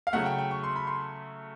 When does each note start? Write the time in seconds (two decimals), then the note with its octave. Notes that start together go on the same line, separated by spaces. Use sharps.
0.07 F5
0.13 C#3 F#3 A3 F#5
0.26 G5
0.38 G5
0.51 C#6
0.64 C6
0.76 B5
0.87 C6